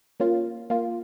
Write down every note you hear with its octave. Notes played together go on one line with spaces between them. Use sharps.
A#3 C#4 F4
A#3 F4